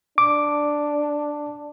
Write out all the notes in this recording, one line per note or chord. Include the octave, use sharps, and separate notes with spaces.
D4 D6